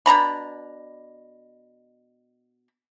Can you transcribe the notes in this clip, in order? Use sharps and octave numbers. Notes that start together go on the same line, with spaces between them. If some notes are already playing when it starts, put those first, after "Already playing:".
B2 D4 A#5 B5